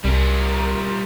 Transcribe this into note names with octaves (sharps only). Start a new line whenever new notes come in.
C2 G3 A#4